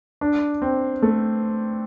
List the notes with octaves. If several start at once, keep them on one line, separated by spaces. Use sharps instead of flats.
D4
C4
A3